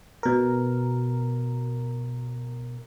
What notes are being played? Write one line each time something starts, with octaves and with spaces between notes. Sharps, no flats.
B2 A#4